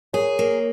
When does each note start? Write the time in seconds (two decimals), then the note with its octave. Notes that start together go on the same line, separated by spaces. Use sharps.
0.13 G#4 A#4 C#5
0.39 A#3